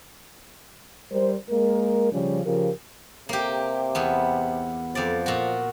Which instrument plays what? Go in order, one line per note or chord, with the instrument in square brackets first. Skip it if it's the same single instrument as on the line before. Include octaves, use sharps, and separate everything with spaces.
[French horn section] G3 A#4 C5
G#3 A#3 A#4
C#3 F3 G3 C#4
C#3 F3 G4 A#4
[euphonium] C3 [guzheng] A#3 G4
[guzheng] E2 B3
[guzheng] F2 D5 [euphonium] F3
[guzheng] A#2 F#4